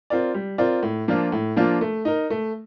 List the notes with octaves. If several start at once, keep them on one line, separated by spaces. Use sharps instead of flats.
C4 F4 A#4 D5
G3
C4 F4 A#4 D5
A2
F3 A#3 D4 F4
A2
F3 A#3 D4 F4
A3
D#4 A#4
A3